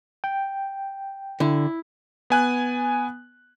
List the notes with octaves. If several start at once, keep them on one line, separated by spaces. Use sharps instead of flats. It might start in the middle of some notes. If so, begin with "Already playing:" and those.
G5
D3 E4
B3 G#5 F#6